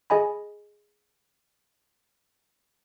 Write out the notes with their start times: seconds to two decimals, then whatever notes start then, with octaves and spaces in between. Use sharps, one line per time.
0.10 G#4 D#5 G#5 B5